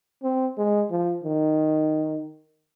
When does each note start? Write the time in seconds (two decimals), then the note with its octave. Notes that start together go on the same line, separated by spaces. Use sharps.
0.23 C4
0.58 G#3
0.91 F3
1.24 D#3